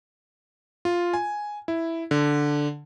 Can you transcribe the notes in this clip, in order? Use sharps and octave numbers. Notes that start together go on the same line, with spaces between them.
F4
G#5
E4
D3